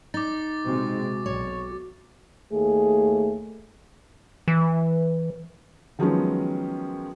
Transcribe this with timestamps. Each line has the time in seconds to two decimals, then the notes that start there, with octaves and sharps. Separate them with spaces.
0.14 D#4 D6 A6
0.65 C3 G#3 C4 F#4
1.26 B1 C#5
2.51 D#2 A3 G#4
4.48 E3
5.99 D#3 F3 F#3 G#3 B3 C#4